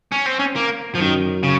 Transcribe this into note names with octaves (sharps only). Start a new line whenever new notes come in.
C#4
C4
C#4
A#3
F3
F#2 D#3
C#3